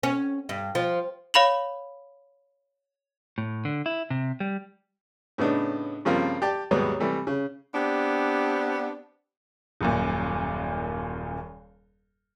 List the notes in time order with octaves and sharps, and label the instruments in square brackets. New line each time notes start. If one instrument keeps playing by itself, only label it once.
[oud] C#4
G2
F3
[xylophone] C#5 F5 B5 F7 F#7
[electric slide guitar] A2
D3
E4
C3
G3
[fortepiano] A2 C#3 B3 D4 D#4
G2 C#3 F3 G3 A#3 C4
G4 D5 A5
D#2 G#2 F#3 G3 B3
C3 E3 G3 A3
C#3
[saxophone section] B3 C4 D4 G4
[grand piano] D#1 F#2 A#2